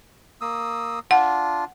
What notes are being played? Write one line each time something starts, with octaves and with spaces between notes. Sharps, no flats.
A#3 D#6 E6
D4 F4 F#5